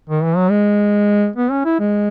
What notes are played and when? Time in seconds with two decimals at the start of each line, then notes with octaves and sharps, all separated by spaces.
0.10 D#3
0.24 E3
0.37 F#3
0.50 G#3
1.36 B3
1.51 C#4
1.65 E4
1.80 G#3